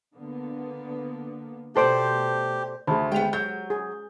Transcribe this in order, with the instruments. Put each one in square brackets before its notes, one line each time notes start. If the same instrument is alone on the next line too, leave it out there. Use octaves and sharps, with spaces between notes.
[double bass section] D3 A#3 B3
[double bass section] B2 A3 [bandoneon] G4 [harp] A4 C5 D5
[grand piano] D2 [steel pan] G#4 C5 [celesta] A5 B5
[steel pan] G#3 [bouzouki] B3 G5 [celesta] G4 F7
[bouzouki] F#3 [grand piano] G6
[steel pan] G#4